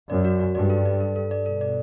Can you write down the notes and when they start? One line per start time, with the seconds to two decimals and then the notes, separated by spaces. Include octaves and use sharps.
0.09 F#2 D5
0.25 F#4
0.40 F#4
0.55 G2 D5
0.70 A4
0.85 D5
1.00 A4
1.16 A4
1.31 D5
1.46 B2 A4
1.61 D5